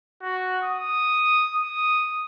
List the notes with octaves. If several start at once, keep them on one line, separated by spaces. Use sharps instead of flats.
F#4
D#6
D#6